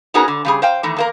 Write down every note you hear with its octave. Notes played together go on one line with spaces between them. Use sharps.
B3 C#4 D#4 F#4 G#4 A#4
D3
C#3 G3 G#4
C5 F5 G5
D#3 E3 A3
E2 A#3 A#4